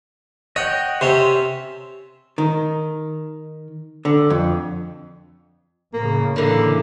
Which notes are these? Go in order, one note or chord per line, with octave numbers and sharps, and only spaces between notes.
C#5 D#5 F#5 G5
C3 C#4 C5 E5
D#3
D3
F2
A2 C#3 A#3
D3 E3 A#3